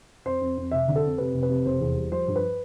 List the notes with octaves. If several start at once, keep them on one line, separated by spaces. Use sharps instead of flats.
F2 C5
F2
F2
F1 E5
D3
A4
F2
C3 B4
F1
B4
C3
F1 C5
E2
G3
F3 C5
G2
B4